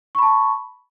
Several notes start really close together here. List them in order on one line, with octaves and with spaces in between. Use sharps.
C#6 B5 A5